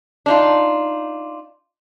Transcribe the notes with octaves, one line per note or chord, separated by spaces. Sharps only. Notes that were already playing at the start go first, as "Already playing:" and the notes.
D4 D#4 F4